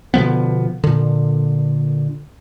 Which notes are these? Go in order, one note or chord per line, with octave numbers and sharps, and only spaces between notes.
B2 D3 F3 B3
A#2 D3